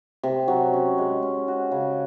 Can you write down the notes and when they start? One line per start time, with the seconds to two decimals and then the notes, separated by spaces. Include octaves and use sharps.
0.23 C3
0.48 F#3
0.73 C#4
0.98 G#3
1.23 C#4
1.48 F#4
1.72 C#3